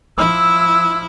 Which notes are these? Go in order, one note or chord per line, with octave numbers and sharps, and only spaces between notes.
F3 E4 E6